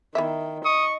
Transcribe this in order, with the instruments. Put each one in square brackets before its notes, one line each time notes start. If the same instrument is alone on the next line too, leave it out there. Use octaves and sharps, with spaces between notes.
[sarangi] D#3 [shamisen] B3 E4 E5
[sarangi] D#5 [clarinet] C#6 [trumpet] D#6